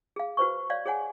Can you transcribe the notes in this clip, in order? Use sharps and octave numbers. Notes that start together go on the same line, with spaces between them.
G#4 F5
F#4 B4 C5 C#6
C#5 D5 F5
G#4 C#5 F#5 G#5